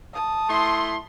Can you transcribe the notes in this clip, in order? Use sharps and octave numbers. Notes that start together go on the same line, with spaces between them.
A5 D#6
A3 E4 C6